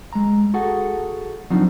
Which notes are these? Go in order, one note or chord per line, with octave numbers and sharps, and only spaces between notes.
G#3 A#5
F#4 G#4 A4 F#5
F3 F#3 C4 D4 D#4 F4